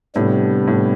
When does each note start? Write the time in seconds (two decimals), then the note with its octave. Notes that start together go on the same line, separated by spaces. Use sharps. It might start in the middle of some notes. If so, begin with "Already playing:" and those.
0.15 A2 C3 G3 B3 D4
0.67 A2